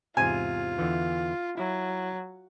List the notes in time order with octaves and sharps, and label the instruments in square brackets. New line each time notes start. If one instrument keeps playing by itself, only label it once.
[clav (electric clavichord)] E2 G#2 C3 [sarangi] F4 [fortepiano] G#5
[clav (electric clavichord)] E2 D3 E3
[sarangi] F#3 [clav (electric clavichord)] E4